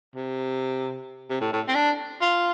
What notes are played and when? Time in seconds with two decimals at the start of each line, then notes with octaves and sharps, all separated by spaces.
0.15 C3
1.30 C3
1.40 A2
1.53 A2
1.68 C4
1.74 D4
2.21 F4